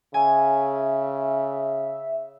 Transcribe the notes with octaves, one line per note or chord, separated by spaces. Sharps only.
C#3 E5 G#5